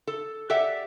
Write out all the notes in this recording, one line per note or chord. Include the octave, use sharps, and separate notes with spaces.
A4
G4 A4 D5 E5 F#5